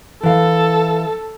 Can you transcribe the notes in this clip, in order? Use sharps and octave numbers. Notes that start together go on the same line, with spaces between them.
E3 A4 F5